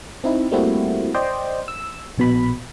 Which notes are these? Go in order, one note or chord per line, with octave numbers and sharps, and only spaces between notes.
C4 D#4 E4
G3 A3 A#3 C4 E4 F#4
C5 D5 D#5 G5
E6
A#1 B2 B5